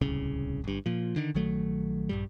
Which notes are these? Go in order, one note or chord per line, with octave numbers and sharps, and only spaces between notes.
D1 C2 C#3
G1 G2
A#2 F3
D3 D#3
A#1 D#3 F#3 A3
A#1 G2 G3